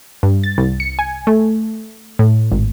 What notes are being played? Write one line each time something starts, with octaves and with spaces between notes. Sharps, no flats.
G2
A6
C2
C#7
G#5
A3
A2
G#1